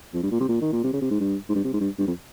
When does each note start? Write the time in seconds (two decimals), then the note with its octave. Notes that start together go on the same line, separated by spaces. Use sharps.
0.14 F2
0.23 G2
0.31 A#2
0.40 C3
0.49 A#2
0.62 D#3
0.72 A#2
0.84 C3
0.93 C#3
1.02 C3
1.11 G#2
1.20 G2
1.49 G#2
1.55 G2
1.64 C3
1.73 G#2
1.81 G2
1.98 G2
2.07 F2